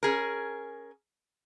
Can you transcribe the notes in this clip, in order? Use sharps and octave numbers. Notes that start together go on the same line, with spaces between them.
C#4 G#4 A#4